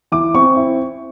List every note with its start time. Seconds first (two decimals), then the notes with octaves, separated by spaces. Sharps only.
0.12 E3 D6
0.34 C4 C#6
0.57 E4